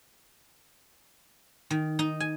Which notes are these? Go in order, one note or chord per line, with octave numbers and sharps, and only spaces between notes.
D#3
D#4
G#5